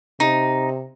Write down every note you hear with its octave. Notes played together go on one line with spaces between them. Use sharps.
C3 D#4